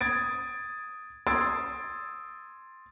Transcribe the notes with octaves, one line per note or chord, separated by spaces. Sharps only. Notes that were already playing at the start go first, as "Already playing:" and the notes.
D#6 G#6 A6 D7
C6 D#6 E6 G#6 A6 D7